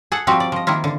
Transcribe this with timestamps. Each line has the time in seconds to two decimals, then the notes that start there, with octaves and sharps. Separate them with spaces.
0.12 G#4 A4 F#5
0.27 F3 G3 C4 F#4 G4
0.40 D5
0.52 F3 D#5
0.67 D#3 A#3 E4 F4
0.84 D3